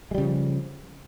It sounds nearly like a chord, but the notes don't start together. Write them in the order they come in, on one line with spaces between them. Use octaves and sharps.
G#3 G3 C#3 F3